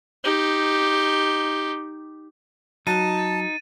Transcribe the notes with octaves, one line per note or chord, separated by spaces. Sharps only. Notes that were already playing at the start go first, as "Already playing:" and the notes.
D#4 G4
F#3 D#4 A5 D#7
A6